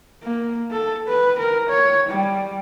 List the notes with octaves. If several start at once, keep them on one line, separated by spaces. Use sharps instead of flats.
A#3
A4
B4
A#4
C#5
G3